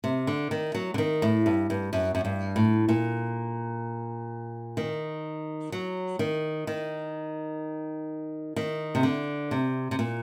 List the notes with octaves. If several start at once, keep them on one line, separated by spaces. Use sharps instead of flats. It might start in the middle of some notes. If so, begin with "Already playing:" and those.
C3
D3
D#3
F#3
D3
D#3
A2
G2
G2
F#2
F#2
G2
A2
A#2
D#3
F#3
D#3
D#3
D#3
C3
D3
C3
C3
A#2